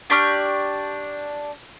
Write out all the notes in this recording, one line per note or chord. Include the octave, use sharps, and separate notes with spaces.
D4 G4 C#6 F6